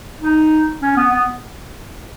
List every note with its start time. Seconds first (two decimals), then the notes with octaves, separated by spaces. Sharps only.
0.20 D#4
0.82 C#4
0.97 B3
1.12 B3